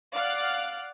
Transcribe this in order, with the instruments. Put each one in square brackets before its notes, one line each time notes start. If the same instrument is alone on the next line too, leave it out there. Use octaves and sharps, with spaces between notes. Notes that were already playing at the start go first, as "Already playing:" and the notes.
[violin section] D5 F5 F#5 F6 F#6